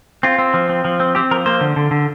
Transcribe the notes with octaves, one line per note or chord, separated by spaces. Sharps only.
C4 F4
C4
F3
C4
F3
C4
C4 G4
F3 A#4
A#3 C5
D3
D3
D3